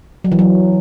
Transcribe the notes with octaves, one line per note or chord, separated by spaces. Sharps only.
F#3
E3
F#3